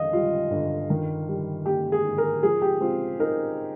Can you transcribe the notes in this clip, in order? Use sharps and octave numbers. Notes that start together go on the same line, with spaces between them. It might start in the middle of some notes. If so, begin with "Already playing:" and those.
Already playing: F2 D#3 D#5 F5
G3 F4
G1
D#3
G3
A#3 G4
G#4
G#2
A#4
F3 G#4
G4
C4 F4
D#4 A#4